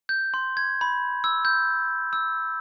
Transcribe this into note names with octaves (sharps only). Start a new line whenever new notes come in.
G6
C6
G#6
B5
E6
G6
E6